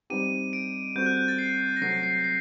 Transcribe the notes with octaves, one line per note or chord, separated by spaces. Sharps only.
G3 C4 D#4 G4 D#7
D7
G3 C4 F#4 A4 G6
F#6
G6
A6
C7
A#6
C3 F#3 A3 C4 C7
C7
C7